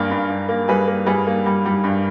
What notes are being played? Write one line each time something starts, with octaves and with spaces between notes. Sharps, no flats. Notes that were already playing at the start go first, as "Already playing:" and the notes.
Already playing: G2 G3 A#3 G#4 A#4
G2
G2
A#3
G3 G#4 B4
A#3
G3 G#4 B4
A#3
G3
G3
G2